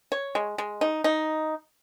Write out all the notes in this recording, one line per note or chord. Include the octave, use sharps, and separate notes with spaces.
C#5
G#3
G#3
D#4
D#4